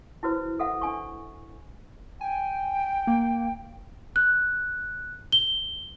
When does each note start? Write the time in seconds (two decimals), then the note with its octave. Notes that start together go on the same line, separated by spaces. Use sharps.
0.23 E4 F#4 B4 C5
0.59 A4 E5 F#5
0.81 D4 G#5 C#6
2.21 G5 G#5
3.07 A#3
4.16 F#6
5.32 G7